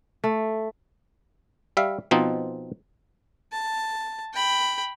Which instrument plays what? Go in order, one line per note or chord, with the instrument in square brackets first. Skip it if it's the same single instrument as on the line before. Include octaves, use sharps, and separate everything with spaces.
[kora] A3
[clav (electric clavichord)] G3 E5 F5
B2 F3 C4 D#4
[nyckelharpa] A5
G5 B5